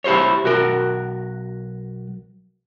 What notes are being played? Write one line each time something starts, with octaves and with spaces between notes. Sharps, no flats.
E4 G4 C5 C#5
B1 F#4 A#4